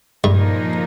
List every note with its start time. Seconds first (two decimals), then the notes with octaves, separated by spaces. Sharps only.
0.24 G2 A#2 F3 A#3 D#4